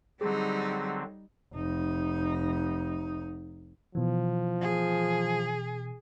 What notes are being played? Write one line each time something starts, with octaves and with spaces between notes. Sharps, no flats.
D3 F#3 G3 C4 D#4 G#4
F1 D#4
B2 E3 F3
G#4